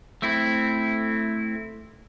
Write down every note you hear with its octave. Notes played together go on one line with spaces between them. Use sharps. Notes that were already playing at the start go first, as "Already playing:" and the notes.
A3 C4 E4